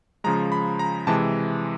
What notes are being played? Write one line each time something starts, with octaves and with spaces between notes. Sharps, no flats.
C#3 F3 G#3 A#5
B5
A#5
C3 E3 G#3 A5